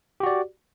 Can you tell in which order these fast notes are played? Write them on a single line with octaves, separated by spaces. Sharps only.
G4 F#4 D5